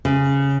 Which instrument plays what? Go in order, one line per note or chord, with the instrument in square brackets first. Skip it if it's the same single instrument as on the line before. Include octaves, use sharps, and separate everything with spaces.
[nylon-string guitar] C#3